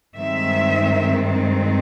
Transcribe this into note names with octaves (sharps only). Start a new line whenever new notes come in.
G2 D#3 G#3 C4 E5